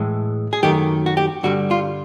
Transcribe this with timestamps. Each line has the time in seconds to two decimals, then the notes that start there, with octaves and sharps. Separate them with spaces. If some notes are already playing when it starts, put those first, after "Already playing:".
Already playing: A2 E3 G#3
0.53 G#4
0.63 F#2 D#3 F#3 A3 G4
1.06 F#4
1.17 G4
1.43 G2 D3 G3 F#4
1.71 F4